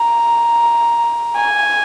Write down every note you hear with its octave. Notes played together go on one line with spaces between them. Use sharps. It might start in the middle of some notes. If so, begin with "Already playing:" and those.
Already playing: A#5
G#5